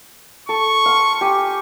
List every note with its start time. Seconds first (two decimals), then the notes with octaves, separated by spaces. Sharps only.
0.49 A4 C#6
0.86 F5 C6
1.21 G4 G#5